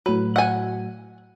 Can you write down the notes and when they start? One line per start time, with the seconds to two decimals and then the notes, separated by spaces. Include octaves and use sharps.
0.06 A2 F#3 B4
0.36 F#5 G#5